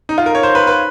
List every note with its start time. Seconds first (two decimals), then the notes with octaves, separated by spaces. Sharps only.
0.09 D#4
0.18 F4
0.26 A#4
0.35 C#5
0.43 C5
0.55 B4
0.67 B4